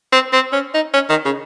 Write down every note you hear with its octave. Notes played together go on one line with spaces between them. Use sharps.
C4
C4
C#4
D#4
C#4
D#3
C#3